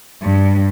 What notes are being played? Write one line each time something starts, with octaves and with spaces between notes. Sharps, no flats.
G2